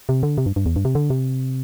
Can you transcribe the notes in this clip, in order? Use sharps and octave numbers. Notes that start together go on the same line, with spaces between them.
C3
D3
C3
G2
G2
E2
G2
C3
D3
C3